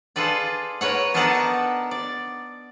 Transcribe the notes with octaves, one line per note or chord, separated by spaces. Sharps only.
F4 G#4 A4 B4 D5
A#4 B4 C#5 F#5
B3 D4 D#4 A4 A#4 F#5
D5